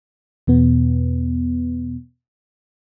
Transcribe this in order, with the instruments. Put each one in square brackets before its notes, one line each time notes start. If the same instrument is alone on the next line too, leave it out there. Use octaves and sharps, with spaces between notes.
[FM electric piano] E2 B2 B3